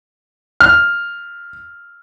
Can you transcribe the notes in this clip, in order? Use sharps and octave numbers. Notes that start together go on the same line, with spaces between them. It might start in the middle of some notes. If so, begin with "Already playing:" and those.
F6